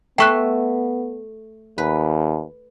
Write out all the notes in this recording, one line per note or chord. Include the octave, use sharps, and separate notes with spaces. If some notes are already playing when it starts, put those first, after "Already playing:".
A3 B3 E5 G5 C6 C#6 F#6
D#2 B4